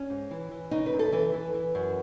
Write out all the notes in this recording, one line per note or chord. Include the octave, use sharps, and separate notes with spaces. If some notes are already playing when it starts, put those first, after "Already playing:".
Already playing: C#4
G#2
E3
E3
C#3 D#4
B4
F#2
A4
E3 B4
E3
E3
F#2